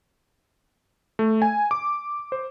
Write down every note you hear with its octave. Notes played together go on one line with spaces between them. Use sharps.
A3
G#5
D6
C5